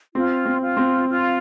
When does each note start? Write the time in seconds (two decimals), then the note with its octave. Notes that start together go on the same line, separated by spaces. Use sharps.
0.14 C4 F4
0.46 C4
0.62 F4
0.77 C4
1.09 F4